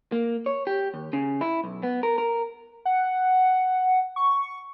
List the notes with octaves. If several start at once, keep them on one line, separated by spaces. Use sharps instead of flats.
A#3
C#5
G4
D#2
C#3
E4
B1
B3
A#4
A#4
F#5
C#6